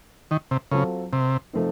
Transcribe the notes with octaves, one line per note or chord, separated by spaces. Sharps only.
D#3
C3
C#3 F#3 C4 F4 A4
C3
C3 F3 A3 C4 D#4